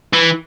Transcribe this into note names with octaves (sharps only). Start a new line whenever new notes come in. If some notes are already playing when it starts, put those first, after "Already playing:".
E3